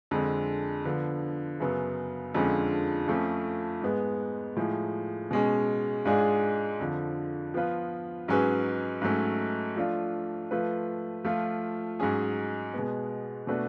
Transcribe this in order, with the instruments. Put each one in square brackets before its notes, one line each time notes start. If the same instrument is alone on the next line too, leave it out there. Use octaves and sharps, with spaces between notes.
[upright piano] F2 D3 G#3
D3 F3 B3
F#2 C#3 F#3 B3
F2 D3 F3 G#3 C#4
F2 F3 A3 C#4
G#2 G#3 B3
A2 F3 G#3
B2 G#3 C#4
G#2 G#3 D4 F4 G#4
F2 D3 F3
F3 B3 F4 B4
G#2 F#3 C#4 G#4 B4
G#2 F#3 A3 C#4
F3 A3 D4 F4
F3 A3 F4 B4
F3 A3 F4
G#2 F#3 C#4 G#4
B2 G#3 B3
B2 A3 D4 F#4 B4